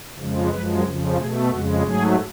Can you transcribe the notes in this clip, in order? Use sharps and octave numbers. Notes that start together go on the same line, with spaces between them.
F2 C#3 F3 G#3
F#2 F3 G#3 B4
F2 C#3 F3
B2 A3 G#4
F2 C#3 G#3 F#4
G#2 F#3 A3 G#4